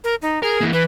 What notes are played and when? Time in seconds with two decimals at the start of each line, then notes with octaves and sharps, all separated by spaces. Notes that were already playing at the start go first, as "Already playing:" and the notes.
0.04 A#4
0.22 D#4
0.43 G#4 A#4
0.61 E3 A#3
0.73 E3 B4